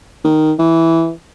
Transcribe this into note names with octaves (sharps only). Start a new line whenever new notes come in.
D#3
E3